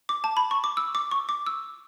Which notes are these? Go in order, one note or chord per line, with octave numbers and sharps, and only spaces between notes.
D6
A5
B5
C#6
D6
E6
D6
C#6
D6
E6